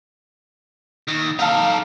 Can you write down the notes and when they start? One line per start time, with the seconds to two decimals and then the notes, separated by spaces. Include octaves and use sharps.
1.08 D#2
1.39 D#4 A4 F5 A5